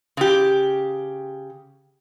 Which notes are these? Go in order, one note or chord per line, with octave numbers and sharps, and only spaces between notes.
C#3 G4